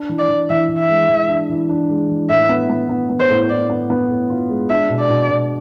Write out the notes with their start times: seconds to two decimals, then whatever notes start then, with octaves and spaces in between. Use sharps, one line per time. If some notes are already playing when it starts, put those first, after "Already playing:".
Already playing: D4
0.09 E3
0.19 D5
0.29 E3
0.50 E3 E5
0.69 E3
0.79 E5
0.89 G#3
1.10 E3
1.29 D4
1.50 E3
1.69 D4
1.89 G#3
2.09 E3
2.29 A2 E5
2.49 B3
2.69 B3
2.89 B3
3.10 B3
3.20 C5
3.29 A2
3.50 A2 D5
3.70 B3
3.90 B3
4.10 A2
4.30 F4
4.50 G#3
4.69 D4 E5
4.90 B2
5.00 D5
5.10 B2
5.30 B2